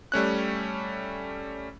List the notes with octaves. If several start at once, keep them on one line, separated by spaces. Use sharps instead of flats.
G3 A3 C#4 F#6